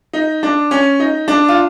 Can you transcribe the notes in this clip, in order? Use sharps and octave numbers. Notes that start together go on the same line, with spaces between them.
D#4
D4
C#4
D#4
D4
F4